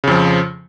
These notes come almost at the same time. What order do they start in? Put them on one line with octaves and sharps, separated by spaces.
C#3 F2 F3